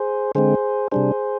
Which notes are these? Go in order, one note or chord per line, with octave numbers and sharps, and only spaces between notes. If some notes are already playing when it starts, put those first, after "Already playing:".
Already playing: G#4 C5
D3 G#3 C4 G#4 C5
C3 G3 D4 G#4 C5